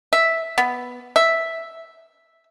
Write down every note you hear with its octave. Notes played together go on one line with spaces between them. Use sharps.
E5
B3
E5